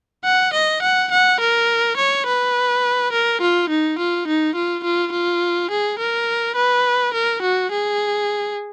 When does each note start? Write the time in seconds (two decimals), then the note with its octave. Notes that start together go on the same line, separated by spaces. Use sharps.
0.24 F#5
0.53 D#5
0.83 F#5
1.11 F#5
1.40 A#4
1.97 C#5
2.26 B4
3.12 A#4
3.41 F4
3.69 D#4
3.99 F4
4.27 D#4
4.55 F4
4.84 F4
5.12 F4
5.71 G#4
5.99 A#4
6.56 B4
7.14 A#4
7.42 F#4
7.72 G#4